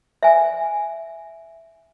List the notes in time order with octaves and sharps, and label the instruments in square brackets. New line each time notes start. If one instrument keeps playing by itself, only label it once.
[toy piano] E5 G#5